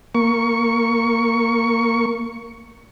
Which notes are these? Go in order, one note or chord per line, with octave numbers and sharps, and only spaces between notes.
A#3 C#6